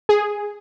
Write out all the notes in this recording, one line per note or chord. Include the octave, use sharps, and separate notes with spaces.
G#4